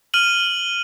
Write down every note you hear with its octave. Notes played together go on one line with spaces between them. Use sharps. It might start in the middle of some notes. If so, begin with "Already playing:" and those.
F6 D#7 F#7